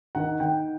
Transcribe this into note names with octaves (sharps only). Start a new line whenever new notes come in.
D#3 F#5
D#3 G5